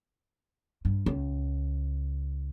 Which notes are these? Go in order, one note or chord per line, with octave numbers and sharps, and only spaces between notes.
G2
C#2